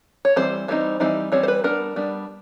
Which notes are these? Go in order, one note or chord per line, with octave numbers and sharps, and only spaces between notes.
C#5
E3 G3 C4 C5
E3 G3 C4 D#4
E3 G3 C4 D#4
E3 G3 C4 C#5
C5
B4
G3 B3 D4 A#4
G3 B3 D4